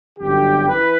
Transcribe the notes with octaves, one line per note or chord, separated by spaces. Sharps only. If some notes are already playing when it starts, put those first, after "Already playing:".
G1 F#2 D3 G4
E3 B4